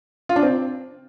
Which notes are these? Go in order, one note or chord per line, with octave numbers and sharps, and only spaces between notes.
F4
D4
C4